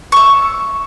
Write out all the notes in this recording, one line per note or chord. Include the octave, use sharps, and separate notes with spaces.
E5 C#6